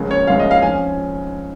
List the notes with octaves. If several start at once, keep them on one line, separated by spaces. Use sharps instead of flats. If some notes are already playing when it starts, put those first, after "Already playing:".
Already playing: C#2 C#3 F3 A#3 C#4
C#5
C#2 C#3 F3 A#3 C#4 F5
D#5
F5
F3 C#4 G#5